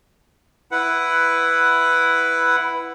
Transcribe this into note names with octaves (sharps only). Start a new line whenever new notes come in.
E4 B4 F#5